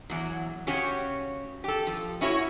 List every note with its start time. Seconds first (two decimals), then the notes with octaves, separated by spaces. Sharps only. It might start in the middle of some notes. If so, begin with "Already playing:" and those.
0.10 E2 F#3
0.67 C#3 C#4 F#4 G4 C#5
1.64 G4 A4
1.87 F3
2.21 C#4 E4 F#4 C#5